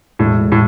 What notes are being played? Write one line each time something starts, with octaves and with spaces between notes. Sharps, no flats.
E1 A2
A2